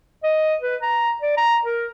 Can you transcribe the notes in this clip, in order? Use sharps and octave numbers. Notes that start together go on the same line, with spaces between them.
D#5
B4
A#5
D5
A#5
A#4